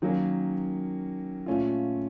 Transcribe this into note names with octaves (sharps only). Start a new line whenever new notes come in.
D#3 F#3 A#3 C#4
A#2 A3 C#4 F4